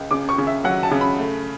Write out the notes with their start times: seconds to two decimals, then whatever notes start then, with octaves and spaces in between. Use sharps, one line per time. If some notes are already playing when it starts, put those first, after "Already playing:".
Already playing: C#2
0.11 C#3 D6
0.29 C#6
0.38 C#3
0.47 E5
0.64 F#3 F#5
0.83 A5
0.91 C#3
1.01 B5
1.18 A3